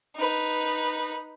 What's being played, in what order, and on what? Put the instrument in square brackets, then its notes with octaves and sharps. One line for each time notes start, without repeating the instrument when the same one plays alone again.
[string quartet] D#4 B4